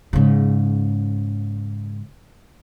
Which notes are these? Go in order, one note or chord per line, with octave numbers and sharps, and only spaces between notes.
G#2 C#3